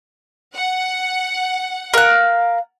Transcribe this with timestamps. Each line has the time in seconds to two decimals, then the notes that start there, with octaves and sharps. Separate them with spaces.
0.55 F#5
1.94 A#4 F5 F#6